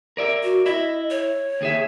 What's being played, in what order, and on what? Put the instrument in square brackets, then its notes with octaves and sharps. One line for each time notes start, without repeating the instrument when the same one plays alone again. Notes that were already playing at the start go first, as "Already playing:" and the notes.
[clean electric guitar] A#4 D5 E5
[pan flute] F#4
[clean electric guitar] E4 E5 [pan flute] D#5
[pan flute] C#5
[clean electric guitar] D#2 G#4 E5